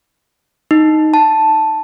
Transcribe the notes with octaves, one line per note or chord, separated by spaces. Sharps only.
D#4
A5